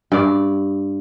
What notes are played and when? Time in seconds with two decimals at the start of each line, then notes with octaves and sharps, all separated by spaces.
0.12 G2 D5